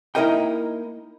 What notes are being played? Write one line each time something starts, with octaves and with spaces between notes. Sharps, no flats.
A#3 D#4 E4 A#4 D#5 G5